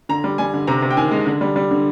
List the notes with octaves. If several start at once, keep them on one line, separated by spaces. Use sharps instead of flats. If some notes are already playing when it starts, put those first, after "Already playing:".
D3 A#5
G3
G3 G#5
D3
C3 A#5
C3
G5
D#3 G#5
G#3
D3
G3
G3
D3